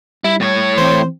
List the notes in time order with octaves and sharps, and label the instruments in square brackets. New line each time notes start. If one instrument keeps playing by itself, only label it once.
[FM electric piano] G3 [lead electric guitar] E4
[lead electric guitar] A2 C#5
[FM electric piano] E3 C4 [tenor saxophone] C5